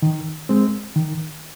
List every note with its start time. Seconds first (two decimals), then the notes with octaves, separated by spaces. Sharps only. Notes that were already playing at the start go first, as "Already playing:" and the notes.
0.02 D#3
0.49 G#3 C4
0.96 D#3